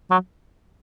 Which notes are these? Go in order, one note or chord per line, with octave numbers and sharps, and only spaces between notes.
F#3